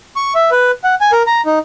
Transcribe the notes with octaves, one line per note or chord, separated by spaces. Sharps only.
C#6
E5
B4
F#5
G#5
A#4
A#5
D#4